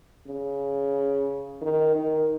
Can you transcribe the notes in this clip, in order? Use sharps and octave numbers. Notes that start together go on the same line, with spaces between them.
C#3
D#3
D#3